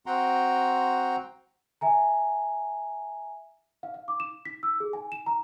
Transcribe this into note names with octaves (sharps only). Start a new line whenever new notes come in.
C4 F#4 F#5 G5 A#5 C6
E5 G#5 A#5
F5
F5
D6
E7
B6
E6
G#4
G#5
E7
A#5